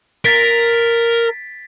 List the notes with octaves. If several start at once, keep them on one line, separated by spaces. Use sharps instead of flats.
A#4 A6 B6 D7